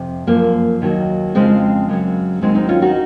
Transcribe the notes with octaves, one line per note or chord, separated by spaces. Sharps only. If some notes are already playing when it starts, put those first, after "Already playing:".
Already playing: F2 C3
F#2 F3 A#3
D#2 D#3 F#3
F2 C#3 F3 G#3 C4
F#2 C#3 F#3
D#2 D#3 F#3 G#3 C4
C4 D#4
C#4 F4
D#4 F#4